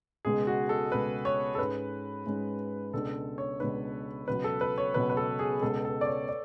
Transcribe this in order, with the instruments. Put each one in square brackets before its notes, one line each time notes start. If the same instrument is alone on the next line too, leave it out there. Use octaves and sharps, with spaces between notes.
[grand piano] C#2 B2 G#3 [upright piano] G#4
[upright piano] F#4
A4
[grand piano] C#2 B2 G#3 [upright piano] B4
[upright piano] C#5
A4
[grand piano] G#2 G#3 C#4 [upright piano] B4
[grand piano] G#2 G#3 C#4
[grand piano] C#2 B2 G#3 D4 [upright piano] A4
[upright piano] C#5
[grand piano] C#2 B2 G#3 D4 [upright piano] B4
[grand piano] C#2 B2 F#3 [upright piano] B4
[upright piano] A4
B4
C#5
[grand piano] C#2 B2 F#3 [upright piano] B4
[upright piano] B4
A4
G#4
[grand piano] C#2 B2 G#3 [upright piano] A4
[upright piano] A4
D5
C#5
D5